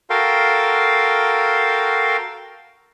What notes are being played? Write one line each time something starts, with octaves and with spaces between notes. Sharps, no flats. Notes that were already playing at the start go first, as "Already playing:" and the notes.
F#4 A4 A#4 F5 G5 C6